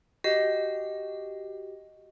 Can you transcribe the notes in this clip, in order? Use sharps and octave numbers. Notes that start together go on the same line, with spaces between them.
F#4 G4 D#5